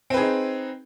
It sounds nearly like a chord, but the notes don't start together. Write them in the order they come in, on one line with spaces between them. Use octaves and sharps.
C4 B4 G#4 D#4